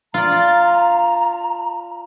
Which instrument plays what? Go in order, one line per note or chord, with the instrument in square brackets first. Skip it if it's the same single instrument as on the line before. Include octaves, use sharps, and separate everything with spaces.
[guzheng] F4 D5 [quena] A#5